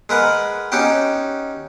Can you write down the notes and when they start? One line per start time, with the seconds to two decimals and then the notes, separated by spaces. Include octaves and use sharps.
0.09 G#3 A#4 B4 F#5
0.72 C#4 D#4 F#4 G4 G5